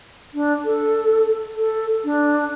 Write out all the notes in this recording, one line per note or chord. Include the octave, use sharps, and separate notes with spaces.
D4
A4
A4
D4